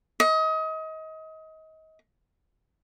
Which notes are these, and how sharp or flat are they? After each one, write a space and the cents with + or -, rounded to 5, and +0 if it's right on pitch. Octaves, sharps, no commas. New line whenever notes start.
D#5 +30